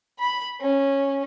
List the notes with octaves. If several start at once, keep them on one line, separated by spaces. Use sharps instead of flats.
B5
C#4